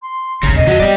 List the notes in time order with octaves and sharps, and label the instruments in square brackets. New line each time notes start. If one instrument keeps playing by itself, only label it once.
[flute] C6
[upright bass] G#1 D#2 [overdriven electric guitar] C#3 [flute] A#5
[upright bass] G#2 B2 [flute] D#5
[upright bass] E2 [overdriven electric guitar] F3 F#4
[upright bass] G3 B3 [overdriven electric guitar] G4 D5